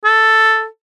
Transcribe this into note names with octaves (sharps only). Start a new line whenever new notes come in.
A4